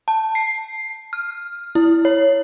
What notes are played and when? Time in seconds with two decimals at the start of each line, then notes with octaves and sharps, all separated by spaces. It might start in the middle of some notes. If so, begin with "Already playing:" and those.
0.08 A5
0.35 C7
1.13 F6
1.75 E4
2.05 C#5